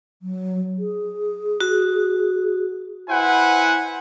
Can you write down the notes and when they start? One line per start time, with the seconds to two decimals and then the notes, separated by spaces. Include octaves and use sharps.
0.22 F#3
0.79 G#4
1.60 F#4
3.09 E4 B4 C5 F#5 G#5